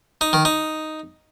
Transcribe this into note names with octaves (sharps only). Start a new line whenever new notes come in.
D#4
D#3
D#4